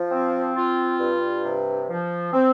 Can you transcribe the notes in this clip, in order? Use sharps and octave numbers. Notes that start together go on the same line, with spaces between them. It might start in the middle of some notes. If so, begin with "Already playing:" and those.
Already playing: F3
C4
F4
G2
C3
F3
C4